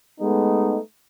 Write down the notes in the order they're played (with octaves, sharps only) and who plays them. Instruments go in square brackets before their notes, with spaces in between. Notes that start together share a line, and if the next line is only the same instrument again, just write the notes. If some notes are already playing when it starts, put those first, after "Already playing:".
[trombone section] G#3 A3 B3 D#4